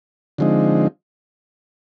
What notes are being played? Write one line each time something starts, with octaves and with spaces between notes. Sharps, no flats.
D3 F3 G#3 C4 D#4